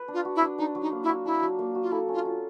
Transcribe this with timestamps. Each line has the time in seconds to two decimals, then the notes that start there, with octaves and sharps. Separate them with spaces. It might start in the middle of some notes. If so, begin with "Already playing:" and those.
Already playing: B4
0.08 D4
0.14 F4
0.25 F#4
0.36 E4
0.42 D4
0.58 D4 D#4
0.75 F#3
0.81 D#4
0.92 A#3
1.03 E4
1.09 F#4
1.25 D4 E4
1.42 F#3
1.59 A#3
1.75 F#4
1.82 F4
1.92 E4 A4
2.09 C#4 F4
2.25 F4